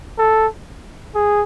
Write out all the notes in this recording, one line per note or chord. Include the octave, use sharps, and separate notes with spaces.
A4
G#4